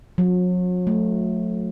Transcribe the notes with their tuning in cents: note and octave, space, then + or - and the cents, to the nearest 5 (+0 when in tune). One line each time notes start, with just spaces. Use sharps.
F#3 -40
A3 -10